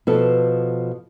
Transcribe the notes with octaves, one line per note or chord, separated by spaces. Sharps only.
B2 F3 A4